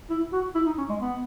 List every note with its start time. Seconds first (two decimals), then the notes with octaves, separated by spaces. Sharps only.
0.10 E4
0.32 F#4
0.55 E4
0.66 D#4
0.78 C#4
0.89 G#3
1.00 B3